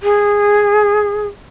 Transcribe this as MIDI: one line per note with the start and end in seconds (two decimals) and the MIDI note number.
0.03 1.27 68